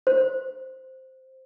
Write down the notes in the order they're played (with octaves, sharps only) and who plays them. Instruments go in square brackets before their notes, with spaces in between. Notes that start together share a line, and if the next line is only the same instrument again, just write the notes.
[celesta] C5